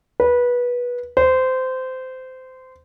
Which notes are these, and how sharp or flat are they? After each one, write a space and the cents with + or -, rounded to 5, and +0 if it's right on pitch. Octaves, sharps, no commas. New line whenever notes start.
B4 -20
C5 -20